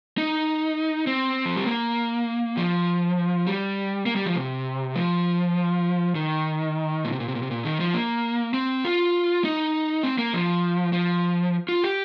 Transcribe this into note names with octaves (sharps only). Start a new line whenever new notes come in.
D#4
C4
F3
G3
A#3
F3
G3
A#3
G3
F3
C3
F3
D#3
A#2
C3
A#2
C3
A#2
C3
A#2
D#3
F3
A#3
C4
F4
D#4
C4
A#3
F3
F3
F4
G4